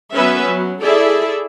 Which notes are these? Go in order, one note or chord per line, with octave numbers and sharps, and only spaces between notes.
F#3 B3 C#4 B4 E5
F#3
E4 G#4 A4 D5 E5